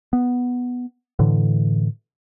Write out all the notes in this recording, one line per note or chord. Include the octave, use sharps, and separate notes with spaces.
B3
A2 D3 E3